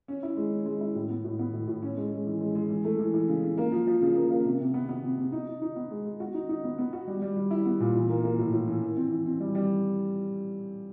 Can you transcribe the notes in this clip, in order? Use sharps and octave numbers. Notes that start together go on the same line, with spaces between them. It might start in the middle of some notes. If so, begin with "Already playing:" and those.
C#4
E4
G#3
C#4
G#3
E4
A2
B3
A2
B3
A2
A2
C#4
G#3
G#3
E3
G#3
G#3
E3
A3
E3
E3
C#3
C#3
A#3
F3
F3
C#3
A#3
A#3
C3
C3
B3
B3
C3
C3
D#4
D#4
D#4
B3
G#3
G#3
F#4
D#4
D#4
B3
B3
F#4
G3
G3
G3
E4
B3
A#2
E3
A#3
A#3
A2
A2
E3
E3
C4
E3
C4
G3
G3